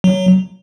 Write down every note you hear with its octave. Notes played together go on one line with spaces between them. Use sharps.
F#3